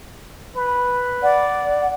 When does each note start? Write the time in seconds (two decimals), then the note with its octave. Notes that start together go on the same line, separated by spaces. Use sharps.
0.56 B4
1.23 D5 F#5